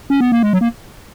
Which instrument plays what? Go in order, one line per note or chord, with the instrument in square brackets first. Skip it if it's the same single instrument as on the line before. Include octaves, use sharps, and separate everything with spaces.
[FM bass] C#4
B3
A#3
G#3
F#3
A#3